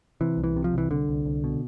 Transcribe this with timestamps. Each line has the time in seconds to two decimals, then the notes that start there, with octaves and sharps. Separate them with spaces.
0.21 C3 E3
0.38 C2
0.44 E3
0.56 C3
0.64 F3
0.74 C2 E3
0.90 C2 D3
1.09 C2
1.25 C2
1.44 B2